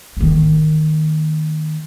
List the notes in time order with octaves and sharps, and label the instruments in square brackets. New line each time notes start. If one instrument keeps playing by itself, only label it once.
[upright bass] D#3 A#3